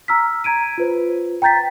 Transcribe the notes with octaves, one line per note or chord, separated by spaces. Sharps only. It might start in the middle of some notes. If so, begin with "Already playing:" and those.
A#5 E6 F6 B6
A#5 G#6 D7 D#7
F4 B4 C5
G5 A#5 G6 A6 B6